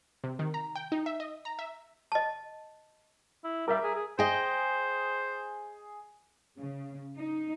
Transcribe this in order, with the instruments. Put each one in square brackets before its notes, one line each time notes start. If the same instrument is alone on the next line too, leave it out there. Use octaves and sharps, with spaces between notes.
[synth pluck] C3
D#3
A#5
G5
D#4
E5
D#5
A#5
E5
[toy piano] D#5 A5
[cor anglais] E4
[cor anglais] G3 [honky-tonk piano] A#4 E5
[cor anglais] G#4
G#4
[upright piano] G#4 [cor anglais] C5 [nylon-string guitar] D#5 G5
[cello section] C#3
D#4